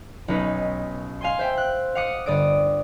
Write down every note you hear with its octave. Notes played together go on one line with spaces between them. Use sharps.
B1 C#4 D#4 B4
F5 G#5 C6
C5 E5 G5
F#6
F5 F#5 D6 D#6 C#7
G1 D5 D#6 D7